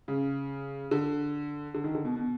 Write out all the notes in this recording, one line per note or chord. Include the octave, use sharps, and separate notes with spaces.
C#3
D3
D3
D#3
D3
B2
B2